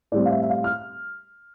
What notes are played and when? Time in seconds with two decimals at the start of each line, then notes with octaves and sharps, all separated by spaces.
0.12 A2 G3 C4 D5
0.26 F5
0.31 E5
0.42 E5
0.50 F5
0.64 F6